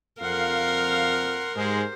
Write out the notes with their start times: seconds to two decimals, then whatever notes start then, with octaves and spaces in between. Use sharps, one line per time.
0.21 F2 A#4 F5 F#5 C6
1.56 G#2 G#3 G4 C5